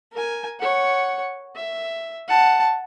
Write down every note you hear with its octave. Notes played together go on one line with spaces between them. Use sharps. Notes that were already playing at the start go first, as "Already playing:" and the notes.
A#4 G#5
C#5 F#5
E5
F#5 A5